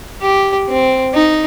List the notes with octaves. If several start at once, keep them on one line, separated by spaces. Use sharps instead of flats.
G4
C4
D#4